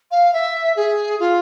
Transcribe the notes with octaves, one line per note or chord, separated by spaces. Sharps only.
F5
E5
G#4
F4